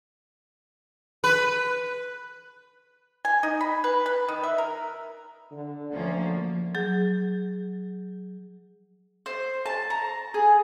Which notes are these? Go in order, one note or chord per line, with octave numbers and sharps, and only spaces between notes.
B4
G#5
D#4
B5
B4
B4
D#3
E5
A#4
D3
D2 F3 A#3 C#4
F#3 G#4 G6
C5
A5
A#5
G#4